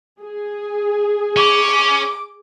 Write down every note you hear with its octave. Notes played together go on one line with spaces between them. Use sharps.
G#4
C#4 D6